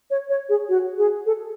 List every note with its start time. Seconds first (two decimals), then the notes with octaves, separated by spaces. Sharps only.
0.11 C#5
0.29 C#5
0.49 G#4
0.69 F#4
0.98 G#4
1.26 A4